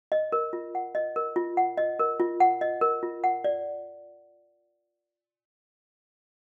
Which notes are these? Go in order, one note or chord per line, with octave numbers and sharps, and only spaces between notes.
D#5
A#4
F4
F#5
D#5
A#4
F4
F#5
D#5
A#4
F4
F#5
D#5
A#4
F4
F#5
D5